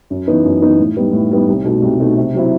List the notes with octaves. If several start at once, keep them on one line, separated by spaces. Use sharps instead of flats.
F#2
E3 B3 D#4
F#2
E3 B3 D#4
A2
G3 B3 D#4
A2
G3 B3 D#4
C2
B2 A3 D#4
C2
B2 A3 D#4
C3
F#3 C4 E4